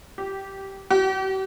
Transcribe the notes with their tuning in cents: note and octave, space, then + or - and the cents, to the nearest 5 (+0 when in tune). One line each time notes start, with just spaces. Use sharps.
G4 -15
G4 -40